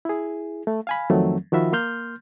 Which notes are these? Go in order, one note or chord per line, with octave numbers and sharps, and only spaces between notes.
E4 G#4
A3
F5 G#5 B5
F2 D#3 F3 F#3 A3 C4
D#3 F3 F4 F#4 E5 B5
A#3 C6 F6 G6